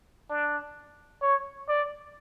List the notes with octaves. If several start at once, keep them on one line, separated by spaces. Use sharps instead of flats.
D4
C#5
D5